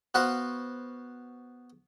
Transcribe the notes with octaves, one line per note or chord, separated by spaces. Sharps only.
B3 F#4 B4 C5 F5